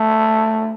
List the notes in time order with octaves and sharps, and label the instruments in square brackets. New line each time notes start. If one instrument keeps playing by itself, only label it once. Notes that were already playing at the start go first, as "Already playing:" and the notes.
Already playing: [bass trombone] A3